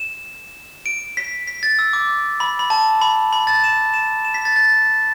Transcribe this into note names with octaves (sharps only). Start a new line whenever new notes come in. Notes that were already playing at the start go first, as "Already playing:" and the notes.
Already playing: E7
D7
B6
B6
A6
E6
D6
B5
B5
A5
B5
B5
A6
E7
E7
E7
B6
A6
A6